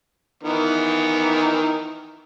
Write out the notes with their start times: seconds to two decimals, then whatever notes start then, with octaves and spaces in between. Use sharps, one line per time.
0.43 D#3 E3 B3